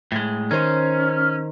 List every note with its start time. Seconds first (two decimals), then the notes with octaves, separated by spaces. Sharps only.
0.12 A2 G#3
0.51 D#3 C#4 C5